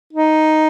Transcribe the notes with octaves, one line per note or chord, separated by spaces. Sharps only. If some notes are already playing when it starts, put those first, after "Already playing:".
D#4